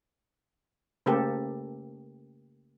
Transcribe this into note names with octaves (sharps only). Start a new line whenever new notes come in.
C#3 A3 A#3 G4 A4 C5